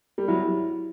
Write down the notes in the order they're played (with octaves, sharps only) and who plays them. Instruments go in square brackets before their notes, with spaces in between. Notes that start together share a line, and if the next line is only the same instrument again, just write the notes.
[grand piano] G3
[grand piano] F#3 [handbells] E4